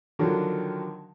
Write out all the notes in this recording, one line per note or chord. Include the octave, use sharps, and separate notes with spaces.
D3 D#3 F3 F#3 D4